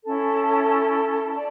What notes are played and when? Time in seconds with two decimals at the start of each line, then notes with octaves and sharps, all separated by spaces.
0.04 C#4 E4 A4
1.32 D5 A5